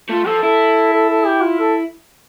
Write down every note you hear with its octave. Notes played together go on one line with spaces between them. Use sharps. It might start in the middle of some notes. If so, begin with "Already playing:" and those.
A3 F4
F3 A4
E4 A4
A4
A4
G4
F4
A4